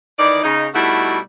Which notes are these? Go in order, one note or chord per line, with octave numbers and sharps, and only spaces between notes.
D#3 E3 D#4 D5
C#3 D#4
B2 G3 A3 D#4 E4 F#4